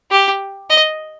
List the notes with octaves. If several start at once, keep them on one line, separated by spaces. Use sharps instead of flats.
G4
D#5